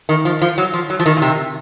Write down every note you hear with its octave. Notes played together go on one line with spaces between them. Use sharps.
D#3
F3
F3
F#3
F3
F#3
F3
D#3
A#2
C3